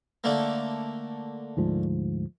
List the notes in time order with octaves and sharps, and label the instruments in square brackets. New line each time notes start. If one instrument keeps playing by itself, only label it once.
[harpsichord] D3 A3 A#3
[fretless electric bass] D2 G#2 F3